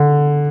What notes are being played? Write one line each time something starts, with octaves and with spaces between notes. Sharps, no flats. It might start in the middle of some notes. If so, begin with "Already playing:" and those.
Already playing: D3